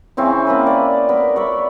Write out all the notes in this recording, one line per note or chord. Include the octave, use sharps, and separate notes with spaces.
C#3 E3 C4 C#4
A#3 B3 B4
D5
B3 A#4
C#5 D5 E5 B5